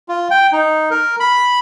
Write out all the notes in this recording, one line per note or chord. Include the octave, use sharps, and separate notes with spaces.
F4
G5
D#4
A#4
B5